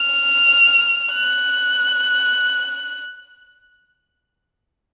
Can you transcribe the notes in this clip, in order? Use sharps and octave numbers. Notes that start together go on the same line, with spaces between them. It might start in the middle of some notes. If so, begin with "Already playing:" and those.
Already playing: F6
F#6